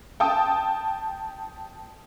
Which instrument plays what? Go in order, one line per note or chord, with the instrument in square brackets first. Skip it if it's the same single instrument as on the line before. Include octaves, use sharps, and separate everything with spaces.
[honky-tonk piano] G5 A5 D#6